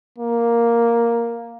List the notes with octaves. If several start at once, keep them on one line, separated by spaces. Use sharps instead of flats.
A#3